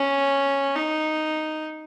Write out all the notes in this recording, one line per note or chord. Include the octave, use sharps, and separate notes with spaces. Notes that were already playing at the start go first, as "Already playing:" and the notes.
Already playing: C#4
D#4